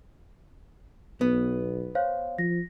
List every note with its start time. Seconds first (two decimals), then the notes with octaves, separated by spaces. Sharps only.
1.21 B1 B3
1.95 C5 C#5 F5
2.38 F3 A#6